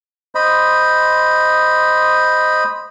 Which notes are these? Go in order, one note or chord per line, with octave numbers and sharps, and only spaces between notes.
C5 D#5 B5